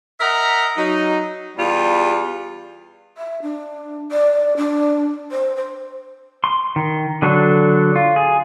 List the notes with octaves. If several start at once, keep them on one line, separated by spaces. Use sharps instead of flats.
A#4 D#5 E5 F#5 A#5
F#3 D#4
E2 G3 F4
E5
D4
D5
D4
C5
C5
C6
D#3
D3 F#3 D4 A4
F4
G#4